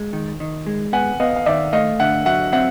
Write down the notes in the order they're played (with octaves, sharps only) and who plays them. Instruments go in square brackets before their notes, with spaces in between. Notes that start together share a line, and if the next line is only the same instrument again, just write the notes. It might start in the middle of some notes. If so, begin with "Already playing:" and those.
Already playing: [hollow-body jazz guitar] G#3
D#3
D#3
G#3
[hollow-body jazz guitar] B3 [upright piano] F#5 G#5
[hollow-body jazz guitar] B3 [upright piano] D#5 F5
[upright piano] F5
[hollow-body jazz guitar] D#3 [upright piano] D5 E5
[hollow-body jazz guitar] A3 [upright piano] D#5 F5
[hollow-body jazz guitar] D3 [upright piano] E5 F#5
[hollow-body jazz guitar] F#3 [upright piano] E5 F#5
[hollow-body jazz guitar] C4 [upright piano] E5 F#5